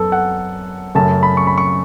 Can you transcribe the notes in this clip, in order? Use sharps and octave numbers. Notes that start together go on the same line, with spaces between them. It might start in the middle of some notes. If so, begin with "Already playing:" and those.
Already playing: F#2 B3 A4
F#5
F#2 C#3 A3 A5
B5
C#6
B5
C#6